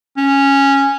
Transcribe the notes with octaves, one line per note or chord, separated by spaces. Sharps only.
C#4